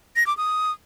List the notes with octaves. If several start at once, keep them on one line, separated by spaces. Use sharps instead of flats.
A#6
D6
D#6